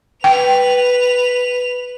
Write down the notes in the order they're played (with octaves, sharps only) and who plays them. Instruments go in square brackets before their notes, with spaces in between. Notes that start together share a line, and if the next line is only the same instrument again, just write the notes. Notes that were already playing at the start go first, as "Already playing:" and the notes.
[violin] B4 F7 [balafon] G5